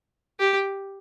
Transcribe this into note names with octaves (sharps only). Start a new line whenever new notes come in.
G4